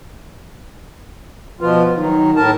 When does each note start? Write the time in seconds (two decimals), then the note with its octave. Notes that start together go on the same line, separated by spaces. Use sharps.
1.61 B2 F3 F4 B4
1.96 D#3 F#3 D#4
2.36 A2 A#4 A5